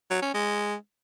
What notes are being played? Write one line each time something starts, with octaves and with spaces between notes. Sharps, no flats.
F#3
C#4
G#3